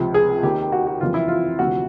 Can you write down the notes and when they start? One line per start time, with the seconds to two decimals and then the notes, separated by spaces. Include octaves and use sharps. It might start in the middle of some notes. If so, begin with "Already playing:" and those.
Already playing: C#2 C3 F3
0.14 G#4
0.43 D#2 D#3 G4
0.72 F#4
0.87 F#4
1.01 F#1 F2 C3 E3 F4
1.14 E4
1.28 F4
1.59 D2 C3 F3 F#4